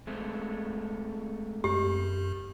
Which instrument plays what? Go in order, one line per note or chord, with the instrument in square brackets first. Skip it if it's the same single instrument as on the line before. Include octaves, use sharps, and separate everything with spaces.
[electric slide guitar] G#3 A3 C4
[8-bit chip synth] F#2 [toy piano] G4